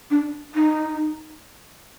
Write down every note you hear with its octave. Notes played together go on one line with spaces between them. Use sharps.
D4
D#4